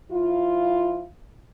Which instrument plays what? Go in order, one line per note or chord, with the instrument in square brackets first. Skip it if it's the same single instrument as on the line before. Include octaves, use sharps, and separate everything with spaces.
[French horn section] F3 E4 F4